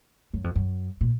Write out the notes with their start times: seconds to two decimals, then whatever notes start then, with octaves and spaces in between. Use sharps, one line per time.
0.33 F#2
0.44 F2
0.55 F#2
1.01 A#2